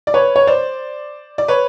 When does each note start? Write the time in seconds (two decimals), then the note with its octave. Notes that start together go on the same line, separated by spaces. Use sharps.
0.07 D5
0.14 B4 C#5
0.36 C#5
0.47 C5 D5
1.38 D5
1.48 B4 C#5